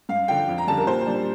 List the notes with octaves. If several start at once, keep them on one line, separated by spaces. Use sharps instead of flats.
G2 F5
D3 F3 G5
F2
A#5
D3 G3 A5
A#4
A#2 C5
G3 D4